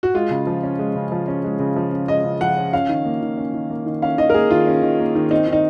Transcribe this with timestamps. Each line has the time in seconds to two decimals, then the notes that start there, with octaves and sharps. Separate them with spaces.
0.03 F#4
0.14 G#3 F4
0.31 C#3
0.47 F3
0.63 C#4
0.79 G#3
0.95 C#3
1.12 F3
1.28 C#4
1.44 G#3
1.60 C#3
1.76 F3
1.92 C#4
2.08 G#3 D#5
2.24 C#3
2.41 F3 F#5
2.57 C#4
2.73 C#4 F5
2.89 D#3
3.05 A#3
3.22 D#3
3.37 C#4
3.54 D#3
3.70 A#3
3.86 D#3
4.02 C#4 F5
4.18 D#3 D#5
4.30 A#4
4.34 A#3 G#4
4.50 D#3 F4
4.67 C#4
4.83 D#3
4.99 A#3
5.15 D#3
5.31 C4 D#4
5.48 D#3 D#4